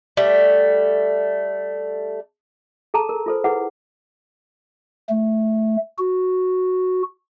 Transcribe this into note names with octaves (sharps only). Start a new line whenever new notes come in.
G3 A3
G#4 A4 A5 A#5
A#4
F4 A4 C5
E4 G#4 B4 F#5
A3
F#4